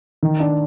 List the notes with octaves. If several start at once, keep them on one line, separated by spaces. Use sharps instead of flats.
D#3
D4